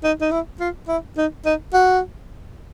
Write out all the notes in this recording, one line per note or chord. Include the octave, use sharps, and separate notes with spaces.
D#4
D#4
E4
F4
E4
D#4
D#4
F#4